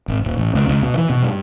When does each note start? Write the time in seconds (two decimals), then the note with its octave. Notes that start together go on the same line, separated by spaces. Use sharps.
0.08 G#1
0.24 D#1
0.38 A1
0.55 C#2
0.68 C#2
0.83 B2
0.97 E3
1.10 B2
1.23 G2